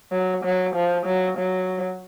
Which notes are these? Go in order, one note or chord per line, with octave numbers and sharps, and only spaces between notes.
F#3
F#3
F3
F#3
F#3